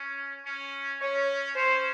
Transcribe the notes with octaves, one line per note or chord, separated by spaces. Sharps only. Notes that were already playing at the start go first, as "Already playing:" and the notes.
Already playing: C#4
C#4
C#4 C#5
C#4 C5